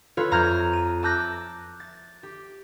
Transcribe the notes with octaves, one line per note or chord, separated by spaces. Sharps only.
F4 A4 B4 C#5
F2 A#5 F6 G6 G#6
D#7
A5 D6 E6 F#6 G6 A#6
A6
G4